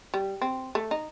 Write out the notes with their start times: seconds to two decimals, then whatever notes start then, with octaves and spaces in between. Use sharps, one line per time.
0.14 G3
0.42 C4
0.75 A3
0.91 D#4